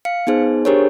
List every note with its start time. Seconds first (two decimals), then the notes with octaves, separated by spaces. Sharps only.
0.05 F5 C#7
0.27 B3 D#4 G#4 C5
0.65 D4 G4 G#4 A#4 C5 C#5